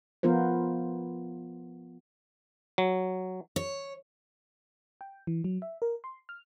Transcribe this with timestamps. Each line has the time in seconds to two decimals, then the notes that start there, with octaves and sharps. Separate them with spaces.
0.23 F3 B3 F4 A#4 C5
2.78 F#3
3.56 C#5
5.01 G5
5.27 E3
5.44 F#3
5.62 E5
5.82 A#4
6.04 C6
6.29 F6